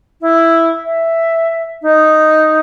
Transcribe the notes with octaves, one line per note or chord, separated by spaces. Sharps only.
E4
E5
D#4